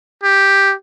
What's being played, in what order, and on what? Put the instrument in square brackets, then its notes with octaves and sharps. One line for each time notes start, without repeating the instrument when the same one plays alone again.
[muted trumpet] G4